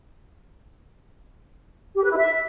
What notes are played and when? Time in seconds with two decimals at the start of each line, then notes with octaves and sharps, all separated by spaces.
1.95 G4
2.02 B4
2.10 E4
2.17 E5